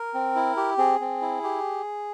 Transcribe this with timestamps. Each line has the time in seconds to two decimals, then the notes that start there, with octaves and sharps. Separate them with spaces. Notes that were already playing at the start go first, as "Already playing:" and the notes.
Already playing: A#4
0.14 C4
0.35 E4
0.57 G4
0.78 C4 G#4
1.00 C4
1.21 E4
1.43 G4